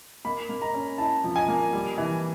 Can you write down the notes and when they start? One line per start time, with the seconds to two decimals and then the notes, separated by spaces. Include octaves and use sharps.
0.25 A#3 B5
0.49 A#3
0.62 A#5
0.74 C#4
0.98 E4 A5
1.24 F3
1.36 G#5
1.48 A#3
1.73 G3
1.98 E3